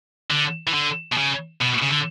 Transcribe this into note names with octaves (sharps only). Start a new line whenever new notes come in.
D3
E3
D3
B2
C#3
B2
C#3
D3